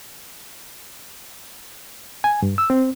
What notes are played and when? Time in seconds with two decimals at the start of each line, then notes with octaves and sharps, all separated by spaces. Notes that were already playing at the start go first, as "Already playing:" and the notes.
2.24 G#5
2.42 G2
2.58 E6
2.70 C4